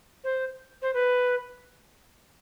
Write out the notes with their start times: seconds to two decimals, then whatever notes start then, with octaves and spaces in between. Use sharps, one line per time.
0.24 C5
0.82 C5
0.94 B4